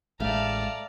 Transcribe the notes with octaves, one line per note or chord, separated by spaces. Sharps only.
A1 G#3 A3 D5 F5 A5 A#5